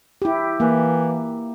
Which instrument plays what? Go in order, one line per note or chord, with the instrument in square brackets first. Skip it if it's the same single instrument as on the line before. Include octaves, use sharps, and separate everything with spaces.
[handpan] E4 G4
[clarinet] E3 [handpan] A#3